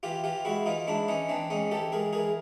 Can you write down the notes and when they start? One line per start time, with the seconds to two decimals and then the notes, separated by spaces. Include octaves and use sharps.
0.03 E3 F4 G4
0.24 E3 F4 G4
0.45 G#2 E4 F#4
0.66 E3 D#4 F4
0.87 G#2 D4 E4
1.08 E3 C#4 D#4
1.29 E3 C4 D4
1.50 G#2 C#4 D#4
1.71 E3 G4 A4
1.92 G#2 G#4 A#4
2.13 E3 G#4 A#4